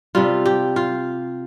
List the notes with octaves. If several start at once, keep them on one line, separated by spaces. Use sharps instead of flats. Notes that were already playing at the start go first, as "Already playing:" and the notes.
C3 G3 F4
G4
F4